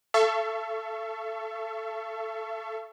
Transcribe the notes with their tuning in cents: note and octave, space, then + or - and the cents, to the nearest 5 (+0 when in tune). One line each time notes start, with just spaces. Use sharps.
A4 +0 E5 +45 C#6 +0